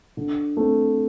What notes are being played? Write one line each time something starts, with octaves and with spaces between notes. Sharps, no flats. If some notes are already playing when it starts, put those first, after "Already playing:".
D3
A3 C4